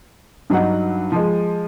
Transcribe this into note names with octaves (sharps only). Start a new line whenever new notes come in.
G2 F#3 D#4 F#5
F3 G#3